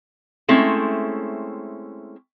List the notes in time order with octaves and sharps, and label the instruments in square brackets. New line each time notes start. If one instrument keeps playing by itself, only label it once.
[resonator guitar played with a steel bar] G#3 A3 C4 C#4 E4